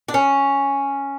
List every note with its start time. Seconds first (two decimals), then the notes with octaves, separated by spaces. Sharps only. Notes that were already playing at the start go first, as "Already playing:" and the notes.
0.09 D4
0.14 C#4